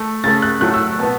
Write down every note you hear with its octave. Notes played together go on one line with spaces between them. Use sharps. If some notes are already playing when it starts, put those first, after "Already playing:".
Already playing: A3
C#3 A3 A6
F#6
A2 F#3 A3 F#6
E6
B2 B3 A5